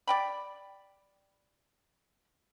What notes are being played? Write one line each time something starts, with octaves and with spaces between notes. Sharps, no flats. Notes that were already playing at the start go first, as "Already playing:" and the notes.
D5 G5 B5